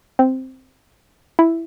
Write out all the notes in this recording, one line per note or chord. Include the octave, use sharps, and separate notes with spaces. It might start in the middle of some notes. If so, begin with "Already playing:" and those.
C4
E4